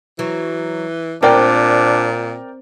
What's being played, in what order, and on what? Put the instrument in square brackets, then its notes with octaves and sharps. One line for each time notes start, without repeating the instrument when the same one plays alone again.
[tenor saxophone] E3 [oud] F#3
[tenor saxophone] A#2 [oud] C4 [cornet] D4 [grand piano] A#4 D5 G5